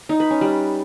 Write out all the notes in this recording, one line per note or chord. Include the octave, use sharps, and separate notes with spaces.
D#4
B4
C#4
G3